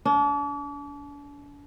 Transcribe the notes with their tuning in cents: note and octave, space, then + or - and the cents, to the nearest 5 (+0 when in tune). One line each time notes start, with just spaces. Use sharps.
D4 -40